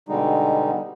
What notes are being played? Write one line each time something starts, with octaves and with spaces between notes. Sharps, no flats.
B2 D3 G3 G#3 D#4